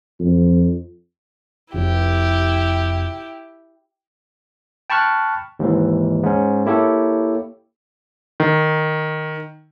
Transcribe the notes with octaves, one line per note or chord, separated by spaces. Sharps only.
F2
F1 E4 G4
G5 A5 B5 C#6 F6 F#6
D#2 G#2 E3
G#2 C#4
A#3 E4 G4 A4 C#5
D#3